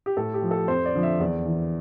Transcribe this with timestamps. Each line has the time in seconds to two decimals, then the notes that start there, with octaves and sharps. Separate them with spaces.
0.06 G4
0.17 A2 A4
0.34 G4
0.42 F3
0.51 A4
0.68 F2 C5
0.86 D5
0.94 D3 F3
1.03 E5
1.20 E2 D5
1.45 E3